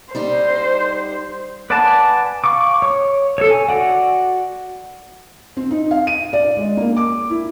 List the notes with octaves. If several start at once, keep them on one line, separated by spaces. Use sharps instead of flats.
G3 D#4 G4 C5
B4 D5 F#5 G#5 A5
F5 C#6 D6
C#5 C#6
A4 C#5
G#5
F#4 D5 F#5
C4
D#4
F5
D#7
D5
G#3
A#3
D6
E4